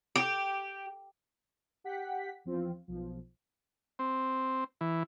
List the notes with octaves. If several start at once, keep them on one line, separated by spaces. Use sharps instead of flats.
G4
G4 F#5 G5 B6
E2 F3 C4 F4
B1 F3
C4
E3